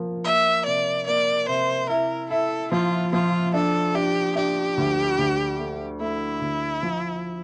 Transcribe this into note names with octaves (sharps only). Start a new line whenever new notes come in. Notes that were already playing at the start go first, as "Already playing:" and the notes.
Already playing: F3 A#3
A#3 E5
C3 D5
A#3 D5
C3 C5
E4 A#4
E4 A4
F3 F4
F3 F4
D4 A4
D4 G4
D4 G4
D2
D2
A3
A3 E4
D2
F3